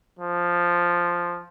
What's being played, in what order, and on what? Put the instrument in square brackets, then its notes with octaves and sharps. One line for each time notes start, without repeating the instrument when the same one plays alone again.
[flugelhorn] F3